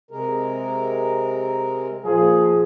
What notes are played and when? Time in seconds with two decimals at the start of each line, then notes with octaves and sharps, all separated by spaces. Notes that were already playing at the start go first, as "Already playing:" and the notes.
0.11 C3 G#3 A#4
2.04 A#2 F3 G#4